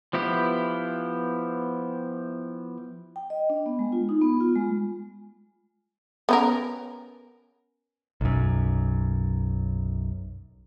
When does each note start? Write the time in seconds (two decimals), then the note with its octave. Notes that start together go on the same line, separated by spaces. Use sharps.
0.13 F3 B3 E4 G4
3.16 G5
3.30 D#5
3.50 D4
3.66 B3
3.79 G#3
3.92 F4
4.09 D#4
4.22 B3
4.41 F4
4.56 G#3
6.29 B3 C#4 A#4
8.21 B1 F#2